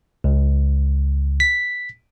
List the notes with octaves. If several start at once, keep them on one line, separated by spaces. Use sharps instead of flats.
C#2
B6